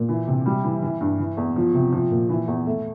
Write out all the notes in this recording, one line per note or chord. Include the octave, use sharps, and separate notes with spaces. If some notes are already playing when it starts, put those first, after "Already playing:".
Already playing: A#2
E3
C3
G3
E3
E3
G2
E3
E2
F3
C3
F3
A#2
E3
E2
A3